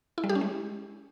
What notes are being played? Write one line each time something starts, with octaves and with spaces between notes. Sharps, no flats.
E4
G3
G4
C#4
G#3